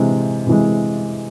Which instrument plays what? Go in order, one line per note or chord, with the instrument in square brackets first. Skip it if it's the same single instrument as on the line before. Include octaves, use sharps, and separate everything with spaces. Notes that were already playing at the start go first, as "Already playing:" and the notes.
Already playing: [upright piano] C3 E3 G#3
C3 E3 G#3